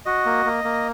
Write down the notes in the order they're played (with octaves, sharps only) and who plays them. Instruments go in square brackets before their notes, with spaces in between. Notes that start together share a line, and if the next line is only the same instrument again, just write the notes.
[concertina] F#4 D#5
A#3
A#3
A#3